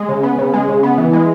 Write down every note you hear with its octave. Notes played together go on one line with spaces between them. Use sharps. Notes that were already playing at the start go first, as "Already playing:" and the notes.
Already playing: G#3
C#3
B3
C#3
G#3
C#3
B3
E3
G#3